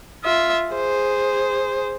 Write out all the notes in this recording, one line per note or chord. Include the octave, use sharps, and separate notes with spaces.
F4 E5
G#4 C5